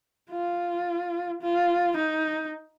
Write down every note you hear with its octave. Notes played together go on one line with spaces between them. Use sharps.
F4
F4
D#4